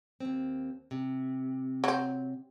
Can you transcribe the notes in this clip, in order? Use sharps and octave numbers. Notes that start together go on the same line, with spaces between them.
D#2 C4
C3
F#3 C4